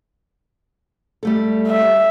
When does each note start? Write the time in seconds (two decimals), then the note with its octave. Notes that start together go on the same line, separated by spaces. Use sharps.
1.23 G3 A3 A4
1.67 E5